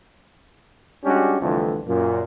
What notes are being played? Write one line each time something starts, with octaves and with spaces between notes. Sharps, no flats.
G3 G#3 C#4 D4 F#4 G4
C2 F2 D3 E3 A3 F4
F#2 A#2